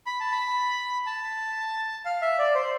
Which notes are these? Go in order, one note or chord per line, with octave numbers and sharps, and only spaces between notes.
B5
A5
B5
A5
F5
E5
D5
C5